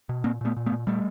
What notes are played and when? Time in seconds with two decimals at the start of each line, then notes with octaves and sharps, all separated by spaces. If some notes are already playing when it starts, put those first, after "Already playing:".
0.09 B2
0.24 A#2 A#3 C4
0.41 A#2 A3 B3
0.57 A#2
0.66 A3 B3
0.72 A#2
0.87 A#2 G3 A3